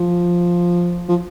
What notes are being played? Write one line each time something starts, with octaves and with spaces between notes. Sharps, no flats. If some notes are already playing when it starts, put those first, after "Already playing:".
Already playing: F3
F3